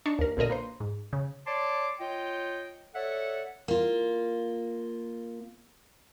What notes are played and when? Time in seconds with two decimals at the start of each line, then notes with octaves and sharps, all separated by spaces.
0.06 D4 D#4 C#6
0.19 D#2 A#4
0.37 B1 A#2 D3 A#4 D#5
0.50 A#3 B4 C5
0.80 G#2
1.13 C#3
1.47 C#5 D5 A5 C6 D6
2.00 F4 C#5 D#5 G5
2.95 A4 C#5 D5 E5 F#5
3.68 A#3 F4